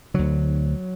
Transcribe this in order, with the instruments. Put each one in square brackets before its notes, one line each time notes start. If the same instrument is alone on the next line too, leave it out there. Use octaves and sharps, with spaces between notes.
[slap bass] D2 D3 F#3